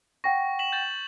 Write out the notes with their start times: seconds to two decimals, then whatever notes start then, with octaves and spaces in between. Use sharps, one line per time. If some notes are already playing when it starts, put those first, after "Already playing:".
0.24 F#5 G5 C#6 A#6
0.59 B6 E7 F#7
0.72 G6 A6 E7